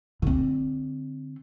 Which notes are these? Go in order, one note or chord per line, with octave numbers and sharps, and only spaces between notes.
D3 C4